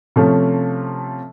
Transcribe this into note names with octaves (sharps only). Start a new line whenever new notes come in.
C3 F3 A3 C#4